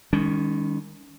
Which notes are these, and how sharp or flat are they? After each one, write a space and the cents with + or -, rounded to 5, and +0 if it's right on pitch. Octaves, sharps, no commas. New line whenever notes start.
D#3 +0 G#3 -45 C#4 +30